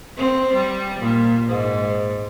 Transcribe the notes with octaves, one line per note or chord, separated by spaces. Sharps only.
C4
G3
A#2
G#2